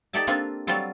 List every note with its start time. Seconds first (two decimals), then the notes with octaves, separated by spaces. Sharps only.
0.13 D#4 G4 A4 D5 E5 A5
0.27 A#3 C4 D4 F4 A4
0.67 F#3 G3 C4 F4 A4